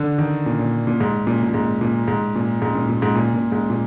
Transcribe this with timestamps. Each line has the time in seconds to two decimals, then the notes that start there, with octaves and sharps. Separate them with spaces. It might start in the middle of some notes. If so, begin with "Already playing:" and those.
Already playing: D3
0.18 D#3
0.46 A#2
0.59 A#2
0.87 A#2
1.00 G#2
1.27 A#2
1.43 A#2
1.54 G#2
1.81 A#2
2.08 G#2
2.35 A#2
2.62 G#2
2.75 A#2
2.89 A#2
3.02 G#2
3.15 A#2
3.34 A#2
3.52 G#2
3.70 A#2